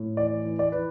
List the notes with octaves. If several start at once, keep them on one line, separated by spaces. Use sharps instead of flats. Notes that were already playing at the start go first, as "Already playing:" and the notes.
Already playing: A2
E3 D5
E3
D5
E3 B4